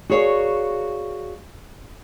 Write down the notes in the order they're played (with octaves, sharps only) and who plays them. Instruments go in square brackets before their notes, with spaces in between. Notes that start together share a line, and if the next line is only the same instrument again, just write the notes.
[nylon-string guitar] F#4 G#4 A#4 C#5 D5 F5